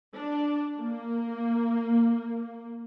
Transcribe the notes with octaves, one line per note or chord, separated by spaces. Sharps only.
D4
A#3